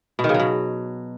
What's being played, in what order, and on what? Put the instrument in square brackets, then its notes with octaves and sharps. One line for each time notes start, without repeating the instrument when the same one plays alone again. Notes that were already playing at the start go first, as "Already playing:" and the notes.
[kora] B2
D#3
C#3
F#3
B2